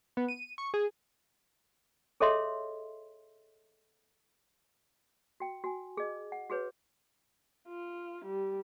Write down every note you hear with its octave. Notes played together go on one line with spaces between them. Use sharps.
B3
D#7
C#6
G#4
G#4 A4 C#5 D#5 E5 C6
F#4 G5
F#4 G#5
G#4 D#5
F#5
F#4 G#4 B4 C#5
F4
G3